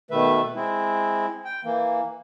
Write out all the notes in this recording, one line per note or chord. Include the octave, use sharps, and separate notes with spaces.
B2 D#3 A3 B4 E5
G#3 C4 E4
G5
E3 A#3